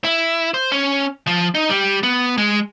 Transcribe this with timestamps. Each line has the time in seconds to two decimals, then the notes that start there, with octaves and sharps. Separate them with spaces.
0.05 E4
0.54 C5
0.72 C#4
1.27 F3
1.55 D#4
1.69 G3
2.03 B3
2.38 G#3